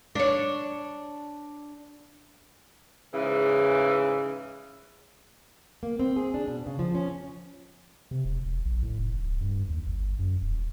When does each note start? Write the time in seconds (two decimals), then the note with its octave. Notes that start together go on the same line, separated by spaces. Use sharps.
0.15 D4 C#5
3.13 G#2 C#3 E3
5.83 A#3
6.00 C4
6.16 G#4
6.34 D4
6.48 B2
6.67 C#3
6.79 F3
6.95 C#4
8.11 C3
8.25 E1
8.45 E1
8.65 A#1
8.82 A2
8.98 F1
9.22 D1
9.41 G2
9.69 D#2
9.86 G1
10.19 F#2
10.41 D#1